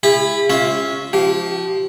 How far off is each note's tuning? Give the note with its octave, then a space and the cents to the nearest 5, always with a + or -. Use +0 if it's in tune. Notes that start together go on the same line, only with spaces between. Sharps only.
E4 +15 G#4 -40 B5 -10
C#4 +0 F4 +0 E5 -20
F3 +0 G4 -30